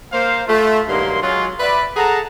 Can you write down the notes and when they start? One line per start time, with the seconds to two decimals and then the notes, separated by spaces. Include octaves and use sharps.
0.12 A#3 C5 F5
0.47 A3 F4
0.89 G2 D#3 F#3 A#3 C6
1.21 F#3 G#3 F4
1.60 B4 D5 E5
1.96 G#4 A4 F#5 A5 A#5